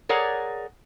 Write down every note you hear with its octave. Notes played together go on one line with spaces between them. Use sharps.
G#4 A#4 C#5 D5 F#5 A#5